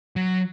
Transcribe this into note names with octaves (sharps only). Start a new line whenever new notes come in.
F#3